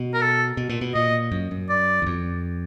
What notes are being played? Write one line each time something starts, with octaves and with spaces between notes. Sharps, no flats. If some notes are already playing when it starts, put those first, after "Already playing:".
Already playing: B2
A#4
A4
B2
A#2
B2
A#2 D#5
F#2
F#2
D5
E2
F2